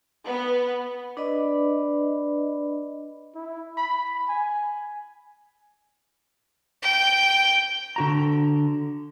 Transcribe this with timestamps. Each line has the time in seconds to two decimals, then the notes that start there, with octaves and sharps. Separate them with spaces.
0.24 B3 B4
1.17 D4 B4 D5 D#5 B5
3.35 E4
3.77 B5
4.28 G#5
6.82 G5
7.96 D3 F#4 A#5